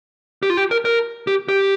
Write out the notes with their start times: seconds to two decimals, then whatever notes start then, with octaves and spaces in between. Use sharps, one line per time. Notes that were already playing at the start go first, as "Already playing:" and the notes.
0.43 G4
0.50 F4
0.57 G4
0.71 A#4
0.85 A#4
1.27 G4
1.48 G4